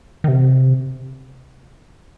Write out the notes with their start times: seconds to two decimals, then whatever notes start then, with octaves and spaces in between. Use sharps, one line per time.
0.24 D#3
0.28 C3